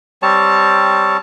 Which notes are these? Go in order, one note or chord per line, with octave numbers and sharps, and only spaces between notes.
G3 C4 C#5 A5